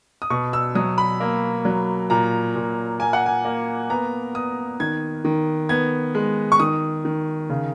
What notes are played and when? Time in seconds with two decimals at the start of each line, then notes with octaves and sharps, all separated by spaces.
0.22 D#6
0.30 B2 C#6
0.53 E6
0.75 F#3 D#6
0.98 B5
1.20 A#3
1.65 F#3
2.10 A#2 A#5
2.55 A#2
3.00 A#3 G#5
3.13 F#5
3.26 G#5
3.45 A#3
3.90 B3 A#5
4.35 B3 D#6
4.80 D#3 G#6
5.25 D#3
5.69 B3 G#6
6.15 G#3
6.52 C#6
6.60 D#3 D#6
7.05 D#3
7.49 C#3